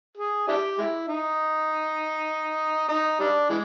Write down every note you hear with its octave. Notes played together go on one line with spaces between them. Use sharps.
G#4
D4 E4 G4
G#3 E4
D#4
D#4
G3 D4
E3 G#3